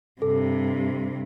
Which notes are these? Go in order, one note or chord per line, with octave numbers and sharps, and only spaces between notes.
G2 C3 A4